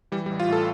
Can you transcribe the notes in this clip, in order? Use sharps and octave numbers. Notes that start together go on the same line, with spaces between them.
E3 G3
G3
A1
F4
A2 A4